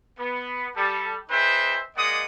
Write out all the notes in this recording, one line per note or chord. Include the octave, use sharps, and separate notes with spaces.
B3
G3 A4
C4 D#4 G#4 B4 C5 E5
G#3 A#3 D5 D#5 F#5 D#6